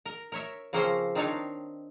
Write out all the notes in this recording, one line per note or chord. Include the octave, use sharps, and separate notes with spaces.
A#4
A#4 C#5 E5
C#3 F3 A#3 C4 C#4 C5
D#3 C4 D4 D#4 C#5 F5